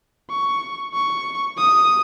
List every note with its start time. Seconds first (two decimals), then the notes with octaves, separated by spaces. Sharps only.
0.30 C#6
0.94 C#6
1.58 D#6